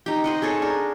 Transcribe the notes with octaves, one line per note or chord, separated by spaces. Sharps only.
D#4 G4
C5 D#5 F#5
G#4 A4 C#5 A5
D4 A#4